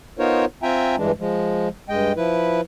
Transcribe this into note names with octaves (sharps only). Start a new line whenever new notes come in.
B3 D#4 F4 A#4 C5 C#5
C4 F4 E5 G5 G#5 A#5
G2 E3 G#3 D4
F3 G#3
G2 G#3 D#5 G5
F3 E4 B4